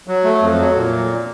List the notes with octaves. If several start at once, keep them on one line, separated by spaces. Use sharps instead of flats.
F#3
A3
F2
F#3
A#2